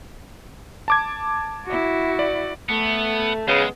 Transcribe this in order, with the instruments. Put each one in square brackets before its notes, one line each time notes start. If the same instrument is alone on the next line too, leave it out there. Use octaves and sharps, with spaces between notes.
[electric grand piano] A5 D6 G#6
[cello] E4 F#4
[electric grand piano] D5
[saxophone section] A3 [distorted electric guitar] B3
[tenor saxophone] C#3 [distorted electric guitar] G#3 [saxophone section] B3 G#4